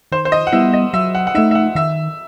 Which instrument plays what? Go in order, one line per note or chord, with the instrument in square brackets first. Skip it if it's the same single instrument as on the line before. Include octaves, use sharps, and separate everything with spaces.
[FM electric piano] D#3 [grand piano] C5
[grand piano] C5
D#5
F#5
[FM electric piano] G3 B3 E4 [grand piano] E5
[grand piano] D#5
[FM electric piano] F#3 [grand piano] E5
[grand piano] F#5
F#5
[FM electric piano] D#4 [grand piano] E5
[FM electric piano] A3
[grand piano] E5
F#5
[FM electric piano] D#3 [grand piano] E5